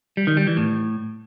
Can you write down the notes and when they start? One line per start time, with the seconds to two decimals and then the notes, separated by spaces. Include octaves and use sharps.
0.17 G3
0.27 D#3
0.37 G3
0.47 E3
0.57 A2